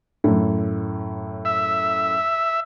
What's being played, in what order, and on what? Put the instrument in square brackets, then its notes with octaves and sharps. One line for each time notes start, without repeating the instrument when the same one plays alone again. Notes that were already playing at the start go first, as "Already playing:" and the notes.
[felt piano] F#2 A2
[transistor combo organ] E5